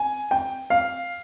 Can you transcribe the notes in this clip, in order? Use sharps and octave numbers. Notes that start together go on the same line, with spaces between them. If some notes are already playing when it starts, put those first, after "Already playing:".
Already playing: G#5
G5
F5